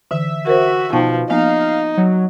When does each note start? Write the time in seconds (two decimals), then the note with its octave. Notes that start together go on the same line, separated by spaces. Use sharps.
0.11 D3 E3 E5
0.47 F#4 A#4 C5
0.93 B2 F3 D#4 G5 A5
1.30 F3 A#3 B3 D#4 F5
1.97 F#3